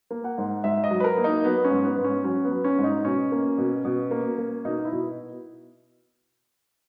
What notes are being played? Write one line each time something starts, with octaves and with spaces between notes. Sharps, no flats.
A#3
F#5
G#2
G#2 E5
D#5
F#3
B4
A#4
A#3
D#4
F#3 B3
C#4
G#2
B3
G#2
C#4
F#3 C#4
B3
F#3
C#4
G#2
D#4
B2 C#4
A#3
B2
B2
A#3
A#3
B2 D#4
E4
B2